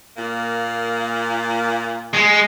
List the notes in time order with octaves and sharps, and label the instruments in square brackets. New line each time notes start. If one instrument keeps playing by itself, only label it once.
[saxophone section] A#2 A#3
[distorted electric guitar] G#3